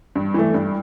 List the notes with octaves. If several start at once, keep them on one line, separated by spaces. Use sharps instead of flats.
G2
E3 A3
G2